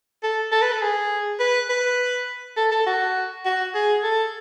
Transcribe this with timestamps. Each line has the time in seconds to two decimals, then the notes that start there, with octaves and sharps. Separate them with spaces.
0.23 A4
0.52 A4
0.62 B4
0.72 A4
0.82 G#4
1.40 B4
1.69 B4
2.57 A4
2.72 A4
2.86 F#4
3.45 F#4
3.74 G#4
4.03 A4